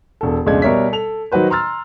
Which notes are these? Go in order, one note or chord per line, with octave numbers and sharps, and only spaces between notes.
E1 A4
F1 C#2 B2 G#3 D4 G#6
B2 G3 A#4 C#5 E5 B6
A4 F7
D#3 F#3 D#4 F#4 B4 C5
A#5 C6 E6 F6 A6